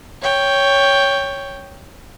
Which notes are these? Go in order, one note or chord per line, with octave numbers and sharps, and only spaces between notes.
C#5 G5